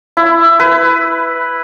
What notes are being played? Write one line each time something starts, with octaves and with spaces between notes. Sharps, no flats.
E4
B4